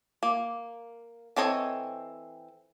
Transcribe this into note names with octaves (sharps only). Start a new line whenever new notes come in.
A#3
E3 C4 A4 C#5 D#5